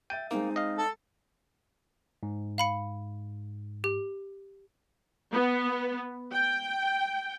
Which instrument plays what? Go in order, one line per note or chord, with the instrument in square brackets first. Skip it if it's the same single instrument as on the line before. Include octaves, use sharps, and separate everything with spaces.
[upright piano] E5 A6 D#7 [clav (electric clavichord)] G5
[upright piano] G#3 C4 [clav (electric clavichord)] A#3 [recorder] D#4
[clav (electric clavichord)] D#5 F5
[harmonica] A4
[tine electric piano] G#2
[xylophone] F5 B5 C#7
G4
[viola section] B3
G5